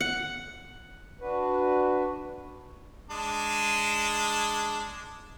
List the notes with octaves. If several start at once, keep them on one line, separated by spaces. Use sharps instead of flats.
F#5
D4 F#4 B4
G#3 D4